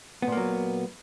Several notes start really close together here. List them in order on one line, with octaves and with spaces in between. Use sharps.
B3 A#2 A#3 F#3